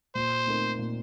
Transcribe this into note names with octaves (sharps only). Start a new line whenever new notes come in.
A#2 C5
A3 C4 D#4 A#4
A#2